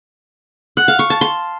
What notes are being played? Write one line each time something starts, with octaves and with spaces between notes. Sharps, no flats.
F#5
F5
C#6
A5
C6